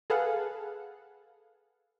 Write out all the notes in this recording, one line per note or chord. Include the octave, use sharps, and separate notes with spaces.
G#4 A4 B4 F5 F#5